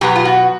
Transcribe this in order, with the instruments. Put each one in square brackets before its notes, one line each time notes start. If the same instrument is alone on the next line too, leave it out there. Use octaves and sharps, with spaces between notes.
[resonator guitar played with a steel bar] B2 F#3 B3 G4
F4
F#4